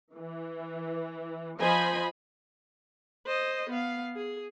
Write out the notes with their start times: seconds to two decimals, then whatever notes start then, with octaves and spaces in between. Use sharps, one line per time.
0.13 E3
1.59 F3 C5 D#5 G#5 B5
3.26 C5 D#5
3.70 B3 F5
4.16 G#4